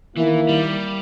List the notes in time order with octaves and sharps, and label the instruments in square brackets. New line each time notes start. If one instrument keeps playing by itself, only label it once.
[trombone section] D#3 A#3 E4 [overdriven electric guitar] E3
[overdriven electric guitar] G3